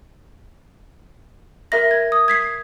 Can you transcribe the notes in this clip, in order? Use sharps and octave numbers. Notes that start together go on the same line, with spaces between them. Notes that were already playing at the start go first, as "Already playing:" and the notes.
A#4 E5 A#6
G#6
D#6
G#6 B6 C7